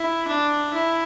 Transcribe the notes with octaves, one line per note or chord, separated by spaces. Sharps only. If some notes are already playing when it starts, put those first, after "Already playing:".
Already playing: E4
D4
E4